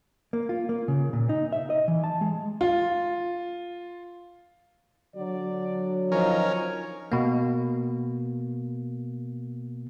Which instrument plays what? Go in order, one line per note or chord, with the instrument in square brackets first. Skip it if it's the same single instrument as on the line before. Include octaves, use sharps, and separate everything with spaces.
[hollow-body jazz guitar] A#3
F4
A#3
C#3
A#2
D#4
E5
D#5
E3
A5
G#3
[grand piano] F4
[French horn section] D3 F#3 [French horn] D5
[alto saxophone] F3 [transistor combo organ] C#4 A#4 [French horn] D#4
[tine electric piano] B2 A#3